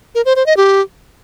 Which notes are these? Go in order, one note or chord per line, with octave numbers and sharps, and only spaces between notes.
A#4
C5
C5
D#5
G4